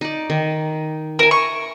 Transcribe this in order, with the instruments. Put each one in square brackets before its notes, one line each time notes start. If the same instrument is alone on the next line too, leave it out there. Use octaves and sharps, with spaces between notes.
[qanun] D#4 D5
D#3
[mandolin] A#4 [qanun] E5 G#5
[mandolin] C#6